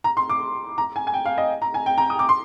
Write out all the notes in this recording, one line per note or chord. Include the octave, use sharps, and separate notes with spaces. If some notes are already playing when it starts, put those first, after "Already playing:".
A#5
C6
D6
A#5
G#5
G#5
G5
F5
D#5
A#5
G#5
G5
A#5
D#6
D6
C6